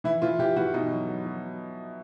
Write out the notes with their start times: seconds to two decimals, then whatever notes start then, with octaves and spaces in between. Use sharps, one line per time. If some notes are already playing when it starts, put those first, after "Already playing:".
0.04 E3 E4
0.22 E3 F4
0.39 E3 G4
0.56 E3 F#4
0.74 B2 D#4
0.92 F#3
1.09 F#3
1.26 F#3